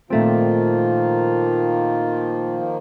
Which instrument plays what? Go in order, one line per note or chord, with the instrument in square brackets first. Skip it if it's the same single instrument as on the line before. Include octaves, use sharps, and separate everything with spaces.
[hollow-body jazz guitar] A#2 A3 C4 [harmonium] D#3 F3 A#3 [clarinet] F4